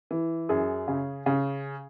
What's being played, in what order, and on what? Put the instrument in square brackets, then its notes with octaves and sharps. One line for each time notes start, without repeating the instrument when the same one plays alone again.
[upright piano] E3
F#2 G#4
C#3
C#3